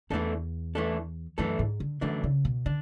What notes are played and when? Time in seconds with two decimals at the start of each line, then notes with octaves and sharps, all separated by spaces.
0.10 E2 E3 A3 D4 A4
0.75 E3 A3 D4 A4
1.38 F#2 E3 A3 D4 A4
1.59 G#2
1.80 D3
2.01 F#2 D3 E3 A3 D4
2.24 C#3
2.45 B2
2.66 D3 D4